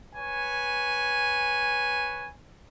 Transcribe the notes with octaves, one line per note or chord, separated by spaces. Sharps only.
B4 C#5 G#5